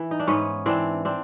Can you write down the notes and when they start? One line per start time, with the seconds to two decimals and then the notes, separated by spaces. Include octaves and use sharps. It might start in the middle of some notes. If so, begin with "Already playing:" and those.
Already playing: E3
0.11 D#4
0.20 D4
0.27 G#2 B3 C#4
0.66 E3 C4 D4
1.05 C4 D4